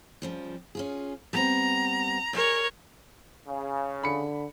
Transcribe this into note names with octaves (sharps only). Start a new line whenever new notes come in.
C#3 F3 G3
C#4 F4 G#4
G3 B3 C4 A#5
G4 G#4 A#4 C#5 D5
C#3
D3 B5 C#7